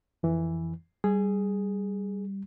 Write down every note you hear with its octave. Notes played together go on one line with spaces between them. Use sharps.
F2 E3
G3 G#4